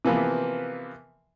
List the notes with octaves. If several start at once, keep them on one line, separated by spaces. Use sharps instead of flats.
C3 E3 F3 A#3 B3